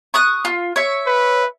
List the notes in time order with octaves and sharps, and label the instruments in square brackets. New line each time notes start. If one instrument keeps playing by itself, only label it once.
[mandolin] C#6 D#6 F#6
F4
C#5 E5
[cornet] B4